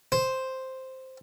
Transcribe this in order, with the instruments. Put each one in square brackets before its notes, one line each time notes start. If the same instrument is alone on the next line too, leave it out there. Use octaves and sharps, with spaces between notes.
[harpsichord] C5